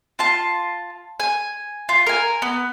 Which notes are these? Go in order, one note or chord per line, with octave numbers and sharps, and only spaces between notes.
F4 A5
G#5
F4
A#4 G#5
B3